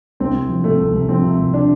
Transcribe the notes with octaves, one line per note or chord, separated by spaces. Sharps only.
C2 C4
C2
F3
C3 A3
C2
C2
F3 C4
C3
C2
D4